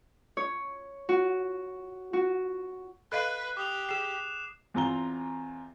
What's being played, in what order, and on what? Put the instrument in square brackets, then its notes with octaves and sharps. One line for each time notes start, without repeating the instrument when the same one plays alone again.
[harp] C#5
F#4
F#4
[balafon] A4 D#5 F5 [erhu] B4 [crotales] F#6 C7
[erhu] G4 [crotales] D6 D#6 F7
[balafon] G#4 G5 [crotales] C7 E7
[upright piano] E2 C4 F4 A#5 G7